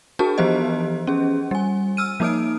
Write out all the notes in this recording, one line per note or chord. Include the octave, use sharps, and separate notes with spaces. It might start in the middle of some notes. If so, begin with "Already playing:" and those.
D4 F#4 G#4 A#4 A5
E3 F3 B3 G4 C5 D#5
C#4 G#4
G3 G#5
E6 F6 D#7
F3 A#3 D#4 D#6 F6 D7